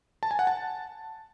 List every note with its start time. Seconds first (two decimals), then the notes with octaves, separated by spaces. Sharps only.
0.23 A5
0.31 G#5
0.39 F#5
0.47 A5